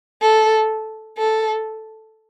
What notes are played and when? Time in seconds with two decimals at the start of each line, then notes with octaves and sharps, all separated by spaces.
0.22 A4
1.18 A4